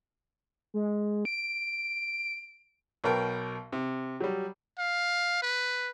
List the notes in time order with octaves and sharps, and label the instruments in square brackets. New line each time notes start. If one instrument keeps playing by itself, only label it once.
[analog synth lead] G#3
D7
[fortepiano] B1 B2 A#4 G5
C3
F#3 G3
[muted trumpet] F5
B4